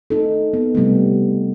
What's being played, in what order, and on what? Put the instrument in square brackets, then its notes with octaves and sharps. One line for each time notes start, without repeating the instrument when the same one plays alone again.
[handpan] D#4 A4
B3
C3 G3 A3 B3